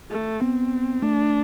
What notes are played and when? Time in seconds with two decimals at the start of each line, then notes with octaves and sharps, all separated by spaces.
0.11 A3
0.41 B3 C4
1.02 A3 D4